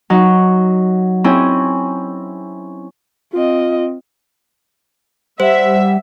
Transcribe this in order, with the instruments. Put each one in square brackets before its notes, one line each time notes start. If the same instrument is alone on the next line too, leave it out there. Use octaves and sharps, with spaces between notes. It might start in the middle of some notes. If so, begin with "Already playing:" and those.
[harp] F#3 D#4
C4 C#4 E4 G#4
[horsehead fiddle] C4 D#5 [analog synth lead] F4
[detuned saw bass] G3 [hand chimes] C5 [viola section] E5 [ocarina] F#5